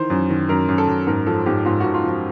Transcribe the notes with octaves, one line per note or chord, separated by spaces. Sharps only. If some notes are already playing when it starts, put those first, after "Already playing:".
Already playing: D#3 E3 C5
F#2
D#3
F#2 A#4
F#2
A4
F#2
G#2 A#4
F3 A4
G#2 G4
G#2 F4
G#2 F#4
F4
F3
F#4